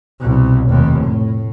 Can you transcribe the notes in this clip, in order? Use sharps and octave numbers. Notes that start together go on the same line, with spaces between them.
C2 B2
F1 D#2
A2